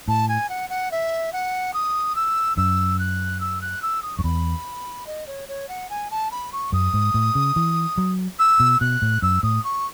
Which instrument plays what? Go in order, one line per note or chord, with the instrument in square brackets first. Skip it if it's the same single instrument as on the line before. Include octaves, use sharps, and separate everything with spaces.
[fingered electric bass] A2 [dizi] A5
[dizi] G#5
F#5
F#5
E5
F#5
D#6
E6
[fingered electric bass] F#2 [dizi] E6
[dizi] F#6
E6
F#6
E6
D#6
[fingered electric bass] F#2 [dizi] C#6
[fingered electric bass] E2 [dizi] B5
[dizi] D#5
C#5
C#5
F#5
G#5
A5
B5
C#6
[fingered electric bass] F#2 [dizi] D#6
[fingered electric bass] G#2
A2
C#3
E3
F#3
[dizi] E6
[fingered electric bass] B2
[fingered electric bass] B2 [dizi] F#6
[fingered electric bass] A2
[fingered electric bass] F#2 [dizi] E6
[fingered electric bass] A2 [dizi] D#6
[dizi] C#6